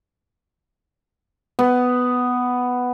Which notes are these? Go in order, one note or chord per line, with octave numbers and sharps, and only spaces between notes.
B3